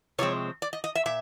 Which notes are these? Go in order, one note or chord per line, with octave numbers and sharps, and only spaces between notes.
C3 F3 G#3 C4 C#5
D5
D#5
D#5
E5
A#2 E5